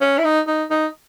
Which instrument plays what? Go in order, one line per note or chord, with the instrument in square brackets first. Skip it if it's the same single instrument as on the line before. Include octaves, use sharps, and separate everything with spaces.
[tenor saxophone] C#4
E4
D#4
D#4
D#4